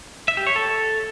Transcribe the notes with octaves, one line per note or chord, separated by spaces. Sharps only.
E5
G4
C#5
A4